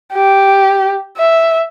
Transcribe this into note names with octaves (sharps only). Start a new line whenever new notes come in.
G4
E5